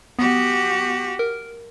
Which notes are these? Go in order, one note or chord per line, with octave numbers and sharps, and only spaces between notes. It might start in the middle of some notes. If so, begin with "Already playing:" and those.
B3 F#4 G4
A#4